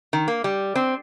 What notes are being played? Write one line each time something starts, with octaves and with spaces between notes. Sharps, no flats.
D#3
A#3
G3
C4